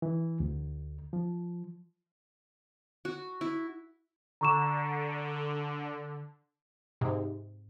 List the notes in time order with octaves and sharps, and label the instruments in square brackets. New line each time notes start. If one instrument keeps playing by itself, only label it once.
[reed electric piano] E3
D2
F3
[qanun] F#4
E4
[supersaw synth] D3 [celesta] A#5 C#6 E7
[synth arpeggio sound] G#2 C3